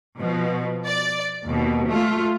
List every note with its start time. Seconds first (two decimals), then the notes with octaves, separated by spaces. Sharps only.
0.18 B2 F3
0.86 D5
1.44 D#2 B2
1.88 A3 F4